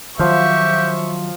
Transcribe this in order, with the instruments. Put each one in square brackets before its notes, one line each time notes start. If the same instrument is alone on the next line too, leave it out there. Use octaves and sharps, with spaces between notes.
[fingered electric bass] D#3 F#3 [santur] F3 F5 [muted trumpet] G4 [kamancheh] E5 C#6